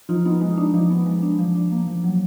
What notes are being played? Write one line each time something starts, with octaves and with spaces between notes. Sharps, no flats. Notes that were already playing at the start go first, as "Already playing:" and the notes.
F3 D#4 F4
B3 D#4
G#3 D#4
D4 D#4
F3 D#4
B3
G#3
D4
F3
D4
A#3
F3
F#3